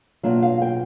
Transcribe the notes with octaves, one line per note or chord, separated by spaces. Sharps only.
B2 F#3 A#3 D4 F4 E5
F5
G5